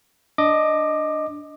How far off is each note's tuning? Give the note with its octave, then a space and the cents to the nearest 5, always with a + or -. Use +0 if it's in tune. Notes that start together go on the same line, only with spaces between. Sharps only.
D4 +0 D#5 +0 D6 +20